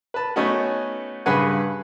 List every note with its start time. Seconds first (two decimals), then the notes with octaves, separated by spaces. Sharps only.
0.14 B4 A5
0.36 A3 B3 C#4 D#4 F#4
1.26 G2 C#3 B4 F#5 G#5